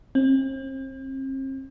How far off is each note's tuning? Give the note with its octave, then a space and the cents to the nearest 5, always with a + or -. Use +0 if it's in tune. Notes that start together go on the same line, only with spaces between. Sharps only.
C4 +40